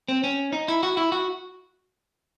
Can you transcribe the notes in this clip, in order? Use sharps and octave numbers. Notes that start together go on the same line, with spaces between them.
C4
C#4
D#4
E4
F#4
E4
F#4